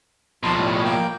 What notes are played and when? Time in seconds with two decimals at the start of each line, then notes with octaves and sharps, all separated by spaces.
0.43 D#2 B2 F3 A5 C6
0.57 A2 G3
0.84 A#3 G5